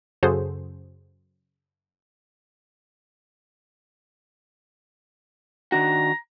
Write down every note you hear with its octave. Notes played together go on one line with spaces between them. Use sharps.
F#2 C#3 F#4 G#4 A4 C5
D#3 D4 F#4 A#5